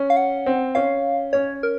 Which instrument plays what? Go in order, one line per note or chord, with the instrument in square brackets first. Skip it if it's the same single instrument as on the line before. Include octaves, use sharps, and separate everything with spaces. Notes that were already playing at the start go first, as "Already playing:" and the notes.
Already playing: [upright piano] C#4
[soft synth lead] F5
F#5
[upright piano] C4
[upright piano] C#4 [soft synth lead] F5
[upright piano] C#4 [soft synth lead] C#5
[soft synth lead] A#4